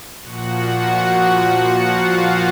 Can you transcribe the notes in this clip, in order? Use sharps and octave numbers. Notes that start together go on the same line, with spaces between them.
A#2 F3 F#4 F#5
F4 F5